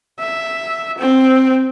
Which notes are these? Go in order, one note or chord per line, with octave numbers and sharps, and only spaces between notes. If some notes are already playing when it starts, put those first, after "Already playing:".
E5
C4